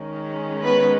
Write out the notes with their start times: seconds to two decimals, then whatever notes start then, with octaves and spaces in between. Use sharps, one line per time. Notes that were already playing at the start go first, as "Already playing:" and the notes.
Already playing: D#3 G#3 C#4
0.64 B3 B4